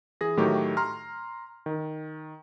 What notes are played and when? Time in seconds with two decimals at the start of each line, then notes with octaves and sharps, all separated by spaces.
0.21 E3 G#4 A#6
0.37 A2 D#3 F#3 A3 G4
0.77 A#5 C6 F6
1.66 D#3